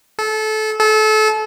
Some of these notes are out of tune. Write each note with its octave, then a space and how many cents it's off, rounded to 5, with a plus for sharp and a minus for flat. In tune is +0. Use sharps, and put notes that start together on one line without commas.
A4 -25
A4 -30